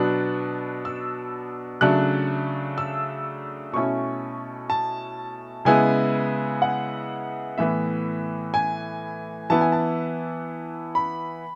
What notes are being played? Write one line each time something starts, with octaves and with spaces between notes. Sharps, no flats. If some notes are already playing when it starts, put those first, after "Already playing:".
Already playing: B2 F#3 B3 D4 F#6
E6
C#3 F#3 A3 D4 F#6
E6
B2 A3 C#4 E4 C#6
A5
C#3 G#3 B3 E4 G#5
F#5
A2 E3 B3 E5
G#5
E3 B3 E4 A5
G#5
A5
B5